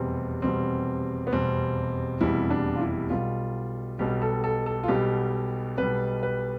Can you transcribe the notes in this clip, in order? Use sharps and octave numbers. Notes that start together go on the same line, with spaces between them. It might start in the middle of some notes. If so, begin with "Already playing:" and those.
Already playing: F1 E2 B2 G3 C4
F1 E2 B2 G3 C4
B3
F1 E2 B2 G3 C4
F1 E2 B2 G3 E4
D4
F4
E4
B1 B2 G3 F4
B1 B2 G3 G4
A4
A4
A4
F4
B1 B2 G3 G4
B1 B2 G3 B4
B4